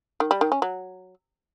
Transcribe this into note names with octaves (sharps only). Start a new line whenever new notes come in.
D#3
G3
D#3
C#4
F#3